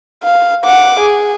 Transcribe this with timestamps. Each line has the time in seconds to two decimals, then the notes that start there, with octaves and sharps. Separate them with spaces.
0.24 F5
0.64 F#5 D6
1.00 G#4